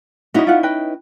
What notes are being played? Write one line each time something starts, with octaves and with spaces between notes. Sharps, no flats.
C#4 D#4 E4 F#4 D#5
F4 F#5
B4 D#5 G5